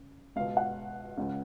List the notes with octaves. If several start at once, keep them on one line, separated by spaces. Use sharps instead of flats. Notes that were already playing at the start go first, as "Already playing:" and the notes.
Already playing: C#3
C#2 B2 F5
F#5
C#2 C#3